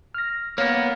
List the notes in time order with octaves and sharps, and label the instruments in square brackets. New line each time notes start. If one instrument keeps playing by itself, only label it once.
[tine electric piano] F6 A#6
[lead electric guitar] A#3 B3 [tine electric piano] C#5